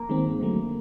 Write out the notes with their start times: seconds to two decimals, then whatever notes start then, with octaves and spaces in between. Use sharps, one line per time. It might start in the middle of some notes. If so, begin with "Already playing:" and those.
Already playing: A#3
0.09 D#3 G#3 C4
0.25 G2
0.41 D3 F#3 A3